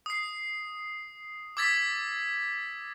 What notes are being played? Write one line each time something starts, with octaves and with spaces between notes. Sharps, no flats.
D#6 C7
D6 E6 G#6 A6 B6